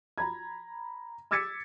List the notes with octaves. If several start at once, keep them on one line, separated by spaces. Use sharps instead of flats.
A#5 B5 G#6
D6 E6 G#6 A6 B6 C#7